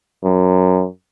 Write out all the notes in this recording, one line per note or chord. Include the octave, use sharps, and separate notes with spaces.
F#2